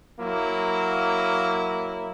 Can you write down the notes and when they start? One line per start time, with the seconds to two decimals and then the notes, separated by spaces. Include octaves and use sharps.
0.19 F#3 A#3 E4